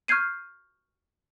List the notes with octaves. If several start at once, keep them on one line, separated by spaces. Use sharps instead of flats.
C#6 F6 G6 G#6 C7 D#7